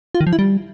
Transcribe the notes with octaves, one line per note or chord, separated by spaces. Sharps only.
F4
D#3
F3
E4
G3